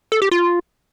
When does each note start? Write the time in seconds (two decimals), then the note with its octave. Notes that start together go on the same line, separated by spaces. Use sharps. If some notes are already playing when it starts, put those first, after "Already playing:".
0.12 A4
0.22 G4
0.31 F4